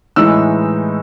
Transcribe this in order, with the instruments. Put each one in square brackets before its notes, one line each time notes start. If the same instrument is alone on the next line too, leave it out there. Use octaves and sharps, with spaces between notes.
[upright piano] A2 E3 G#3 D#4 E6